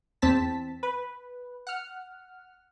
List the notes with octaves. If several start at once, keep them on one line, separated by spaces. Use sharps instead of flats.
E2 C4 A5 B6
B4
F#5 F6